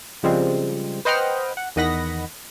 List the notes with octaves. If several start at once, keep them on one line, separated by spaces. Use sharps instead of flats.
C#3 F3 G3 G#3 C4
B4 C5 D#5 F#5 G5 F6
F#5
E2 D#3 D#5 F#5 B5 A#6